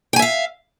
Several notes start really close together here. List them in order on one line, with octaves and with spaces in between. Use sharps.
G5 G#5 E5 F5